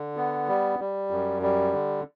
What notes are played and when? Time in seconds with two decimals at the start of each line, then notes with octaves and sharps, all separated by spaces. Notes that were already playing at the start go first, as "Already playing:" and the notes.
Already playing: D3
0.16 B3
0.48 G3
0.79 G3
1.11 F#2
1.42 G3
1.73 D3